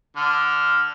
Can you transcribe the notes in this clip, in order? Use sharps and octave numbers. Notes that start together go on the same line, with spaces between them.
D3 F6